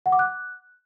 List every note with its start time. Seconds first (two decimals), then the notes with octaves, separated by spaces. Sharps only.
0.06 F#5
0.12 D6
0.19 F#6